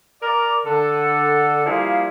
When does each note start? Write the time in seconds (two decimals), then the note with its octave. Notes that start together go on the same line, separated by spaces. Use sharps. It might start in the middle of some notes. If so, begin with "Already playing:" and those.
0.22 A#4 D5
0.65 D3 A4
1.65 F3 G3 A#3 E4 F4 G#4